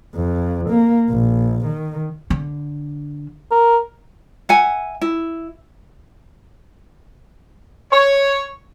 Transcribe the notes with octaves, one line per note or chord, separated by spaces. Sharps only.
F2
A#3
A#1
D#3
D3
A#4
E5 F#5 G#5
E4
C#5